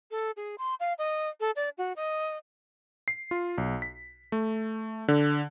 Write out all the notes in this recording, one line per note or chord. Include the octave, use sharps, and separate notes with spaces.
A4
G#4
C6
F5
D#5
A4
D5
F#4
D#5
C7
F4
B1
B6
A3
D3